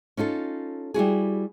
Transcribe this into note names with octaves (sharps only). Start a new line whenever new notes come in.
C#4 D#4 F4 A4
G3 E4 F#4 G#4